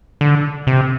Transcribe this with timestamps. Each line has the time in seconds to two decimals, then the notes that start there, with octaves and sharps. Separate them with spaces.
0.21 D3
0.67 C3